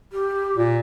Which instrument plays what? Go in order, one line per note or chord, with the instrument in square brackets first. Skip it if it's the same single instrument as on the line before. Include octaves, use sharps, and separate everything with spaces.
[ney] G4
[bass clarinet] A#2